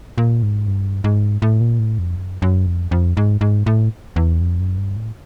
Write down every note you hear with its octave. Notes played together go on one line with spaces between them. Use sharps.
A#2
G#2
G2
G#2
A2
A#2
A2
F2
F#2
F#2
F2
F2
G#2
G#2
A2
E2
F2
F#2
G2
A2